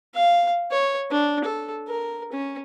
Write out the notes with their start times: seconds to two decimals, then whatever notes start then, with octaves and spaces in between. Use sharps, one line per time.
0.15 F5
0.72 C#5
1.11 D4
1.44 A4
1.88 A#4
2.32 C#4